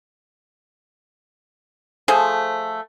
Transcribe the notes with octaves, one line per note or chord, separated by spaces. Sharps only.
F3 A3 G#4 C5